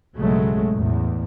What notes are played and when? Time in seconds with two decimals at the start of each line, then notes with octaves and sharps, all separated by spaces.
0.16 B1 G2 C#3 F#3 G#3 A3
0.74 A1 E2 A2